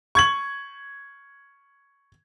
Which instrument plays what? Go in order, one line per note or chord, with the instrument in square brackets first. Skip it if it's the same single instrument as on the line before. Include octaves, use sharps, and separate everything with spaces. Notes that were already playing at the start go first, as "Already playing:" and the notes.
[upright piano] C#6 G#6 F#7